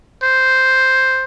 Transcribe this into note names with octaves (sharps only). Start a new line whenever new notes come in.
C5